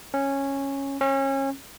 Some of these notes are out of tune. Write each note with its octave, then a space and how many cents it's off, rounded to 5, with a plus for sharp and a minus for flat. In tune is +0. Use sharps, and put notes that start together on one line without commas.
C#4 -10
C#4 -30